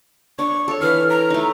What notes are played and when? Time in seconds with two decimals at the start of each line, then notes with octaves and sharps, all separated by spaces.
0.39 D4 C#6
0.68 A4 C#5
0.82 E3 E4 F6
1.10 A#5
1.30 A3 D#4